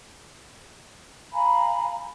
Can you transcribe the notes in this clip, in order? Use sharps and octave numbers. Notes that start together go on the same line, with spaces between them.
F5 G#5 A#5 B5